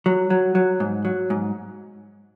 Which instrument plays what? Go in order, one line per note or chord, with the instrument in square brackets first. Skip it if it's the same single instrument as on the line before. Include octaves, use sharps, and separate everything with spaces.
[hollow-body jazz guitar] F#3
F#3
F#3
G#2
F#3
G#2